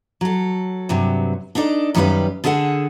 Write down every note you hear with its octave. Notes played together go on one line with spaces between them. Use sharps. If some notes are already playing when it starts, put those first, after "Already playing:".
F#3 A4
G2 C3 F#3
D4 D#4 A4 D5
F#2 D#3 G3 A4 B4 F5
D3 G#4 A4 F5 F#5